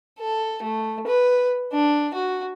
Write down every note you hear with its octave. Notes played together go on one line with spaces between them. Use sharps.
A4
A3
B4
D4
F#4